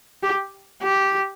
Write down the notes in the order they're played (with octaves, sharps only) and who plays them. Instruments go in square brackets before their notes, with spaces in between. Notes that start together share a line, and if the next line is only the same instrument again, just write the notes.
[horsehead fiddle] G4
G4